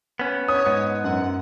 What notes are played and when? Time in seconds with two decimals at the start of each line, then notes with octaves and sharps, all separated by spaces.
0.19 B3 C#4
0.48 C#5 D#6
0.66 G#2 B3
1.04 F#2 F#5